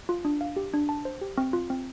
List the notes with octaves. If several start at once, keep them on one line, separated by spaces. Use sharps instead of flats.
F4
D4
F5
G4
D4
A5
C5
G4
C4
F4
C4